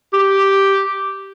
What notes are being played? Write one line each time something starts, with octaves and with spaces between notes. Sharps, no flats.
G4